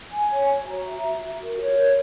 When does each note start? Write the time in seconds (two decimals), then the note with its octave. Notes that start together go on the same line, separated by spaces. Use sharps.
0.11 G#5
0.30 C#5
0.49 F#4
0.67 A#5
0.85 E5
1.04 F#4
1.22 F#4
1.42 A#4
1.60 C#5
1.79 A#4